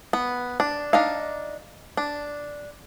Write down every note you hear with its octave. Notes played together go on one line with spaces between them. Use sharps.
B3
D4
D4 D#4 F5
D4